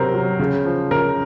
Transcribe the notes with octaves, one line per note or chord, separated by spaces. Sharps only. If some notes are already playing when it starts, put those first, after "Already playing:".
Already playing: C3 F#3 A#4 C5
F#3
C#3
F3
C#3 A#4